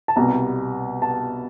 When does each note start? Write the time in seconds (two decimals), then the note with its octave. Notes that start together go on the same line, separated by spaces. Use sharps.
0.08 A5
0.16 C2 B2 G3 A#5
1.02 A5